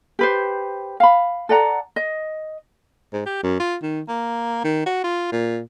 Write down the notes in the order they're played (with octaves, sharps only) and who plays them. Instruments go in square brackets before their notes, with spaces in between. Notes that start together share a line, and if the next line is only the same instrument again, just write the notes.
[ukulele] G4 B4 C5
F5 B5
A4 D5 F#5 A#5
D#5
[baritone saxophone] G#2
G4
F#2
F4
D#3
A#3
D#3
F#4
F4
A#2